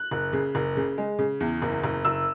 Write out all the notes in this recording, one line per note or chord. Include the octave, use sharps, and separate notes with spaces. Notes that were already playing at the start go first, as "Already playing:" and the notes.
Already playing: F#6
F#1
C#3
F#1
C#3
G#3
C#3
E2
F#1
F#1
F#1 E6